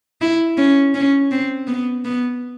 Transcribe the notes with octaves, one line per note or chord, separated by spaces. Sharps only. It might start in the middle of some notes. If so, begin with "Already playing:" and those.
E4
C#4
C#4
C4
B3
B3